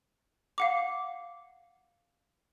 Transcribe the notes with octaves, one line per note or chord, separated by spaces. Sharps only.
F5 F#5 D6